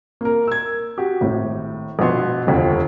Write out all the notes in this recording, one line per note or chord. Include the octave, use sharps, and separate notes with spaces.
A#3 A#4
E6 G#6
F#4 G4
G#1 A2
A#1 B2 B3 C6
F1 D#2 D3 F3